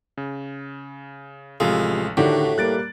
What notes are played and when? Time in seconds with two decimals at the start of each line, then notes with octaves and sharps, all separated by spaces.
0.17 C#3
1.60 A1 C3 F3 G#3 A4 F5
2.17 A2 D3 D#3 D4 F#4 G4
2.58 G3 A#3 F#6 A6 D7